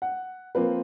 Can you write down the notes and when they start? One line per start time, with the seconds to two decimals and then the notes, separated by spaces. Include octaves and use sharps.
0.02 F#5
0.55 F3 A#3 C4 B4